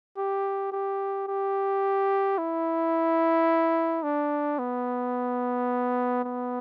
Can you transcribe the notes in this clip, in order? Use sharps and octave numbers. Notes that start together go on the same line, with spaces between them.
G4
G4
G4
E4
D4
B3
B3